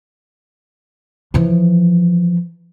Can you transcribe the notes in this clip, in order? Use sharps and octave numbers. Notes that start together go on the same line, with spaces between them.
E3 F3